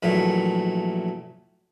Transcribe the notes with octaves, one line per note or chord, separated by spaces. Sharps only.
A#1 A#2 E3 F#3 A3